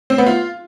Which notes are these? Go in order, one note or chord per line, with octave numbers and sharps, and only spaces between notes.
C4
B3
F4